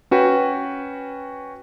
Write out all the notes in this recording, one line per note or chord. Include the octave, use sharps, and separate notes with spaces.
C#4 F#4 B4 G5